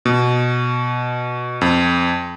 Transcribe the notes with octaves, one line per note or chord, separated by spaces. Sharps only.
B2
F2